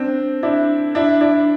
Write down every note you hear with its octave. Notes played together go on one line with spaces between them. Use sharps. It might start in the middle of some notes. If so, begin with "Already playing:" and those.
Already playing: C4 D4
D4 E4
D4 E4
D4 E4